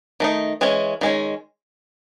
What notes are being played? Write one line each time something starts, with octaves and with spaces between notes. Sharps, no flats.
D#3 A3 D#4
E3 G#3 C#4
D#3 G#3 C#4